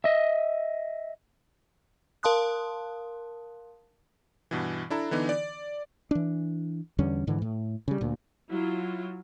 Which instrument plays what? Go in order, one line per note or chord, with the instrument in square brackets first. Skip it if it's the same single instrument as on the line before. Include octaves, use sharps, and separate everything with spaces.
[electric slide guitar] D#5 E5
[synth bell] A#4 F5 A5 C6 D#6 F#6
[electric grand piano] G2 B2 E3
D4 E4 A4 A#5
D3 E3 B3 D#4
D5
[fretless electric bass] E3 D4
E2 D3 G3 C#4
G#2 D3 E3
A2
C#3 G3
D2 A#2
[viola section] F#3 E4 F4